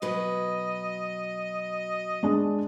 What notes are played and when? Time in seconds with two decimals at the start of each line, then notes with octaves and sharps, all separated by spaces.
0.02 B2 F#3 B4 D#5
2.23 G#3 D4 G#4